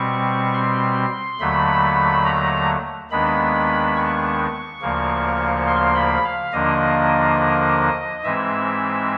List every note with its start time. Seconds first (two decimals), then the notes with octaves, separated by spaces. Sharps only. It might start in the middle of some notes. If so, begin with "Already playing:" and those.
Already playing: B2 G3 C4 C#6
0.54 C6
1.40 D#2 D3 F#3 A3 B5
2.25 A#5
3.10 D#2 D#3 G#3 B3 D4 B5
3.96 C#6
4.81 D2 C#3 F3 A#3
5.67 C6
5.95 B5
6.24 F5
6.52 D#2 D3 F3 A#3 D4 D#5
8.23 G#2 E3 G#3 C4 E5